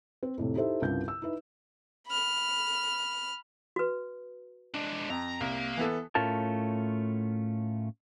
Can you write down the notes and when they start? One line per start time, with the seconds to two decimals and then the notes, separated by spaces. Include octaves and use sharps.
0.23 C4
0.38 F2 A2 C3
0.55 D#4 E4 G4 A4 C5 E5
0.82 C2 G2 C#3 C4 F4 G6
1.08 E6
1.22 D#4 E4 B4 E5
2.07 B5 F6
3.76 F#4 B4
4.75 G#3 D4
5.10 F2 A#5
5.41 C2 A#3
5.77 E3 B3 A4
6.15 A2 A3 C#4 F4 A#4 A5